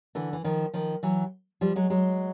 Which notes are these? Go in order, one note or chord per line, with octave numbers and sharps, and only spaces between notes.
D3 E3
E3
D#3 F3
D#3 F3
E3 F#3
F3 G3
F#3 G#3
F#3 G#3